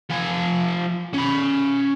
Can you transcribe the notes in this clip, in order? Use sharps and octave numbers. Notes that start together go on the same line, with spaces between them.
F3 G#5
C#4 B5